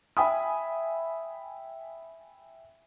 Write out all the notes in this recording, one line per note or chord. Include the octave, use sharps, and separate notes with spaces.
E5 G5 G#5 B5 D#6